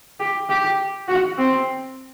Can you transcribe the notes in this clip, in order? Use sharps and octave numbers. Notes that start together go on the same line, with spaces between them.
G4
G4
F#4
C4